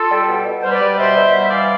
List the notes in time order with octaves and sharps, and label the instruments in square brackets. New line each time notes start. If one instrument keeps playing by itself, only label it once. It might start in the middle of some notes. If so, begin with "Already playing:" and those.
Already playing: [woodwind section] F4 A4
G3
B2
B2
G3 C5
B4 D5
G3
B2 C5 E5
B2
G3
E3 D5 F5